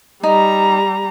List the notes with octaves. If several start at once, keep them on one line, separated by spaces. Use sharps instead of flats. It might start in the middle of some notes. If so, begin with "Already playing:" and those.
G3 D#4 A#5